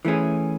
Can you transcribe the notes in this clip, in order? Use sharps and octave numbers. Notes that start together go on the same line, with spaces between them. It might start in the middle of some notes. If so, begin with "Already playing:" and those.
E3 A3 C#4 G#4